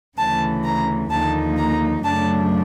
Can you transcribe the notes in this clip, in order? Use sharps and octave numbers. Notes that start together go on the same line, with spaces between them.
D2 C#3 E3 A5
A#5
D#2 D3 F3 A#3 D#4 A5
A#5
F#2 C#3 F#3 A3 D4 A5